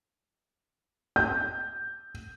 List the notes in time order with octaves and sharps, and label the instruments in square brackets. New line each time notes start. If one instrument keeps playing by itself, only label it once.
[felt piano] G6